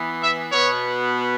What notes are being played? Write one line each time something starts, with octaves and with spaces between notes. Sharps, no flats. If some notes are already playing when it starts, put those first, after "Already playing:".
Already playing: E3 B3
E5
B2 B3 C#5